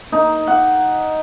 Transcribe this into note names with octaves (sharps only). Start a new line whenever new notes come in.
D#4
F#5